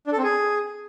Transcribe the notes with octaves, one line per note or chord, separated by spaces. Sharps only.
D4
A4
C4
G#4